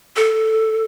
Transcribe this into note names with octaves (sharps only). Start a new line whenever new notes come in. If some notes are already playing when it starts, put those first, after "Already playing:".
A4